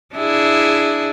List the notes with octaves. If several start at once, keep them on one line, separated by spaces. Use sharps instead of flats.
D4 E4 G#4